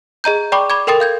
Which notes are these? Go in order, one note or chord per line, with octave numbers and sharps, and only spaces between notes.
G#4 D#5 A#5 G6
D5 G5 B5 C#6 D6
B5 D6 G#6
A4 A#4 G5 C6 D#6 A6
F5 G6 G#6